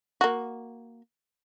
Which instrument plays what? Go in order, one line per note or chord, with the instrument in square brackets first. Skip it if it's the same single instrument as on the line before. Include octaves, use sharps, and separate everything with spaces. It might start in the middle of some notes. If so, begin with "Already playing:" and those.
[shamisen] A#3 F#4